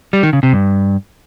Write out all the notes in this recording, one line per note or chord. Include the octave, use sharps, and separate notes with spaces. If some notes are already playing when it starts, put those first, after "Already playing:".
G3
D#3
C#3
C3
G2